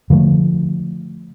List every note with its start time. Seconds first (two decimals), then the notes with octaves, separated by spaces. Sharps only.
0.10 D3 F3 G#3 A3